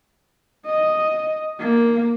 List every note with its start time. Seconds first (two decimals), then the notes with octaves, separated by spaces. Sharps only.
0.66 D#5
1.60 A#3